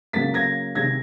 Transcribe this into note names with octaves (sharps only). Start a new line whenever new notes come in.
C#3 F#3 A#3 A6 B6
G#6 A#6
C3 D#3 G#3 G#6 A#6